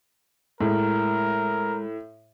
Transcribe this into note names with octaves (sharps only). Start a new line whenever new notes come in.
A2 G#3 A#4